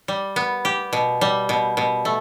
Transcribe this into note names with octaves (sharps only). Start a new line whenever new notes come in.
G3
B3
G4
B2
G3
B2
B2
A3